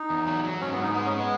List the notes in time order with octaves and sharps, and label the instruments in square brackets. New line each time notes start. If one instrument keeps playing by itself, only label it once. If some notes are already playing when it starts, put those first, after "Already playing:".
Already playing: [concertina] D#4
[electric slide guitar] E2
F#3
F#3
[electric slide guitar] G#2 [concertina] C#4
[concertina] B3
[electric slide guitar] G#2
[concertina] D#4
[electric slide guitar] G#3 [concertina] B3
[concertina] C#4
[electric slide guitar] G#3
[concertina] B3